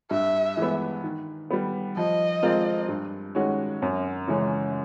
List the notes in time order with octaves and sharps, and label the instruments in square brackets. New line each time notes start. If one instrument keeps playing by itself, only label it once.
[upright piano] G2 [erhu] E5
[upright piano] E3 G#3 B3
D#3
G3 B3
[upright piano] F3 [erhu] D#5
[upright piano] G#3 C4 F4 A#4
G2
D#3 G#3 C#4 F#4
F#2
C#3 E3 G#3 C#4